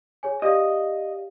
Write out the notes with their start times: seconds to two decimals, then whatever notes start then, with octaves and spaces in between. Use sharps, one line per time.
0.23 G#4 C#5 G#5
0.42 G4 D5 D#5 F5